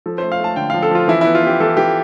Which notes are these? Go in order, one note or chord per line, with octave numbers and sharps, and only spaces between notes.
F3 A4
C5
A3
F5
A3 A5
D3 G5
F5
F3
A4
F3 F4
E3 E4
B3 E4
F4
B3 G4
E3 A4
E3 G4